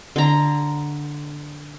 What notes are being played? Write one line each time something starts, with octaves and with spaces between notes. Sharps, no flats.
D3 A#5